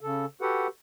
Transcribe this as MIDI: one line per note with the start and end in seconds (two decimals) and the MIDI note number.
0.01 0.25 49
0.01 0.25 69
0.41 0.67 66
0.41 0.67 67
0.41 0.67 69
0.41 0.67 71
0.41 0.67 78